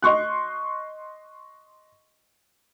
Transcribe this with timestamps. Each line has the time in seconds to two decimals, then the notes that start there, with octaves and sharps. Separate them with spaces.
0.02 D#5 C6 C#6 F#6